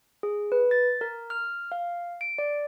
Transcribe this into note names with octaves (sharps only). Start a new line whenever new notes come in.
G#4
B4
A6
A#4
F6
F5
D7
D5